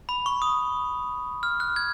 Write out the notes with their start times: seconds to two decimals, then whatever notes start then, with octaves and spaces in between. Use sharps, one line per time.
0.09 B5
0.26 C#6
0.42 D#6
1.43 F6
1.60 F#6
1.76 G#6